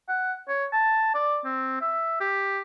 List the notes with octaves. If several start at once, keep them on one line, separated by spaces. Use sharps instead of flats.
F#5
C#5
A5
D5
C4
E5
G4